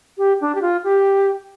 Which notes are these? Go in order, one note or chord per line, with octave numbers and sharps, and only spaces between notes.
G4
D4
G4
F4
G4